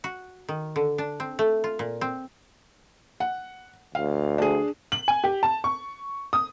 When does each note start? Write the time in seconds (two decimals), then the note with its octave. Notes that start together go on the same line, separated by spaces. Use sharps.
0.04 F#4
0.49 D#3
0.76 D3
0.98 D4
1.20 C4
1.39 A3
1.64 F4
1.79 A#2
2.01 C4
3.20 F#5
3.95 D2 F5
4.38 D4 G#4
4.92 F#7
5.08 G#5
5.24 G4
5.43 A5
5.64 C#6
6.33 D#6